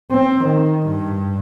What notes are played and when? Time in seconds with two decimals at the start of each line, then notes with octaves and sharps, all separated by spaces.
0.11 C4
0.44 D#3
0.87 G2